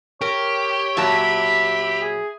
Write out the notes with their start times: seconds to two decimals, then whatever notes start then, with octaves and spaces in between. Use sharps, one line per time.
0.21 G4 A#4 C#5
0.97 A#2 F#3 E5 A5 B5
2.02 G#4